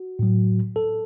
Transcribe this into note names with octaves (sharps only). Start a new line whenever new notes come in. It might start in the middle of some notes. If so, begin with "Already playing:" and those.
Already playing: F#4
A2 F#3
A4